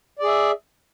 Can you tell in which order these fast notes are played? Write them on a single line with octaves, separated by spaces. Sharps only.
D5 G#4 E5